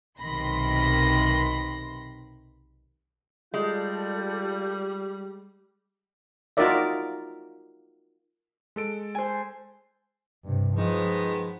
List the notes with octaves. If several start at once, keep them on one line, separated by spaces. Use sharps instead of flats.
B1 C3 D#3 B5 C6 A#6
G3 G#3 F4 A4 D5 G6
D#4 F4 F#4 A#4 D5 E5
G#3 A4 D7
C5 G#5
G2 C3
D#3 F3 G#3 B3